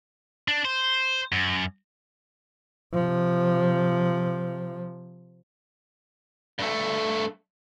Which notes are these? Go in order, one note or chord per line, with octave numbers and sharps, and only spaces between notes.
D4
C5
F#2
C3 F3
G2 A3